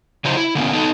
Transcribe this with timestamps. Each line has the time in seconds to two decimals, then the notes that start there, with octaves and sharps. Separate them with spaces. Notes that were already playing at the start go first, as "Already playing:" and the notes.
0.24 C#3 E3 F#3 D#4 C5
0.37 E4
0.55 D3 A#3 B3 C#4
0.73 B3 D#4 A4